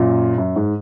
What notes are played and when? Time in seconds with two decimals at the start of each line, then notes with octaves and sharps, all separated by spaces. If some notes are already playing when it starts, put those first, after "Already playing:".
Already playing: F#2 A#2
0.38 F#2
0.56 G#2